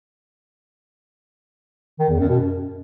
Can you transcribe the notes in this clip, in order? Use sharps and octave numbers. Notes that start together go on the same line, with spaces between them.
D#3
E2
F#2
B2
F#2